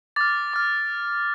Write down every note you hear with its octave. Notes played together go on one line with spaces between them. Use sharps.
D6 F6 A6
D6 F6